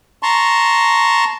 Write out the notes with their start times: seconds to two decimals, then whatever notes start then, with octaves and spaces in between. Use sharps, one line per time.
0.23 A5 A#5 C6 C#6